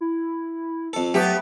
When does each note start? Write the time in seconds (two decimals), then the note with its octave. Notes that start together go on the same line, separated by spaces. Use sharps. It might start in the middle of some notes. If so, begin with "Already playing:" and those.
0.01 E4
0.93 F2 A4
1.14 F#3 A3 B3 G4